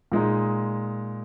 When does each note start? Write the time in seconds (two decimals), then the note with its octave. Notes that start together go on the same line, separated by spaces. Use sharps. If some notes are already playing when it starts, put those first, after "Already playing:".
0.12 A#2 G#3 D#4